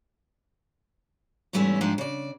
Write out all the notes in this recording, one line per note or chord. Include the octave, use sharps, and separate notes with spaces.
E2 G#2 G3 A3 C#4 E4
G#2 F3 D4 G4
C#3 D5